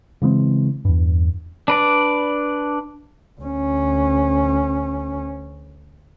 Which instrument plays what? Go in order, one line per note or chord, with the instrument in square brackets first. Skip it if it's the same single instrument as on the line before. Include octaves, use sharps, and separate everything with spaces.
[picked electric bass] C#3 E3 G#3 C4
E2 G2
[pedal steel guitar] D4 B4 D5
[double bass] D2 C#4